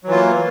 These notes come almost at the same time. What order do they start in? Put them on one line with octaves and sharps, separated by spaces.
F#3 E3 F4 A#3